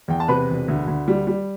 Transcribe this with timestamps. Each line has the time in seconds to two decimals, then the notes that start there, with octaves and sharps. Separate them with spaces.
0.08 E2 G5
0.20 A5
0.28 C3 B4 B5
0.49 E1
0.68 D2
0.87 D2
1.08 G3
1.27 G3